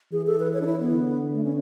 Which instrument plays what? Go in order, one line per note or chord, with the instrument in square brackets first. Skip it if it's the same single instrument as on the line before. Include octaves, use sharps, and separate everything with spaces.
[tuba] E3 [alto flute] G#4
[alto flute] A4
B4
C#5
D4
E4
B3
[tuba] D3
[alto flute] A3
C#4